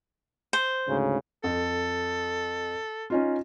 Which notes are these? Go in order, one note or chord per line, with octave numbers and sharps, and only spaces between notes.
C5
D2 G#2 C#3
F2 A4
C#4 D#4 F4